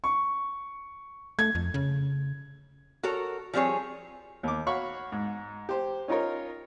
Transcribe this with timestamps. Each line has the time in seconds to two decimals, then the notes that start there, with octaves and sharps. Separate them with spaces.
0.04 C#6
1.39 A3 G#6
1.55 F2
1.74 C#3
3.03 F#4 A4 A#4 C#5
3.53 F3 G3 C4 G#4 C#5
4.43 D#2 D6
4.67 F#4 C#5 F5 B5 C#6
5.12 G#2
5.69 G4 C5
6.08 C#4 D#4 F4 A#4 C#5